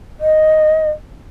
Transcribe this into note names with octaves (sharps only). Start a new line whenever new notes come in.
D#5